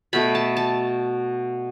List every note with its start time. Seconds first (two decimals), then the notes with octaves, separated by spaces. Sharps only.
0.13 B2 A3 B5
0.35 A5
0.57 A5